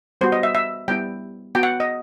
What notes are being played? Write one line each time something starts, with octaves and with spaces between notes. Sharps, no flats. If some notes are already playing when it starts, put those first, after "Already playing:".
G3 B3 F#4 C5
D#5
E5
E5
G3 B3 E4 G5
B3 F#4 G5
F#5
D#5